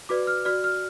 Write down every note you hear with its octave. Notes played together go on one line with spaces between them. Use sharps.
F#4 B4 D5 D6
F6
F#4 D5 F6
F6